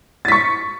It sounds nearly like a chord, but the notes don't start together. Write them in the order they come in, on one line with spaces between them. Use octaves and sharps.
A6 B6 C#6